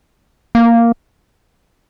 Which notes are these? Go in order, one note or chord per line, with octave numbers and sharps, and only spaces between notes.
A#3